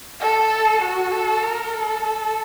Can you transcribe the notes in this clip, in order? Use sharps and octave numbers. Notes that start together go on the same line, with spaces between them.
A4
F#4
A4
A#4
A4
A4